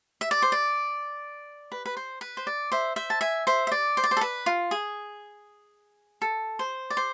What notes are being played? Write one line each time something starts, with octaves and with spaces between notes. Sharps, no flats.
E5
D5
C5
D5
B4
B4
C5
B4
C5
D5
C5 E5
C5 E5
A5
E5 G#5
C5 E5
E5
D5
C5
D5
C5
A4
B4
F4
G#4
A4
C5
D5
C5